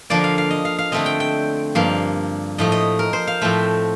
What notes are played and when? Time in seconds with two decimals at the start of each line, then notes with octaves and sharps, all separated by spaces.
0.10 D3 F3 A#3 D5
0.24 F5
0.38 F5
0.51 D#5
0.65 F5
0.78 F5
0.92 D3 A3 C4 D#5
1.06 G5
1.20 G5
1.75 G2 F3 A#3 F5
2.58 A2 F3 A3 D#5
2.72 D#5
2.99 A#4
3.13 C5
3.27 F5
3.42 A2 F3 A3 C4